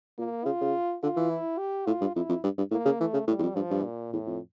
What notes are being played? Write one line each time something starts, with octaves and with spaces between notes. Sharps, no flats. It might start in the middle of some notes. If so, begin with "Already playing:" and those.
A#2 A#3
C#3 F4
C#3
D3 F4
E3
E4
G4
A2 F4
G2
F2 E4
F2
G2
G2
A2 A#3
C#3
E3 A3
C#3
A2 G3
E2
F2
G2 F3
G2
A#2
E2 A2
F2